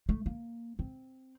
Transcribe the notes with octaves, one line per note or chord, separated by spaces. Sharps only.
A3
A#3
C4